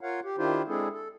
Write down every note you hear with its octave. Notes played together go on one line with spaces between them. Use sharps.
F4 A#4 C#5 F5 F#5
G4
D#3 D4 E4 F4 G4 C5
G#3 C4 D4 E4 G#4 A4
A4